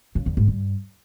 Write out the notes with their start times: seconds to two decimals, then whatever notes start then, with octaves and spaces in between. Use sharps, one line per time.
0.15 C#3
0.26 E2
0.37 G#2
0.48 G2